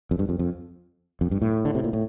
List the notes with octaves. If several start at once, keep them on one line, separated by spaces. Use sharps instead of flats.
F2
G2
F2
F2
F2
G2
A2
D3
C3
A#2
A2